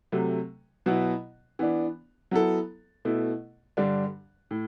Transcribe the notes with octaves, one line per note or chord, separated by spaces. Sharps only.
C3 F#3 A3
B2 F#3 B3 E4
E3 B3 D4
F#3 B3 E4 A4
B2 A3 E4
G2 D3 G3 D4
A2